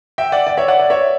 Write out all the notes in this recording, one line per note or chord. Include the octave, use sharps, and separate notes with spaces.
E5 G5
D5 F#5
D5
C#5 E5
D5 F#5
D5
C#5 E5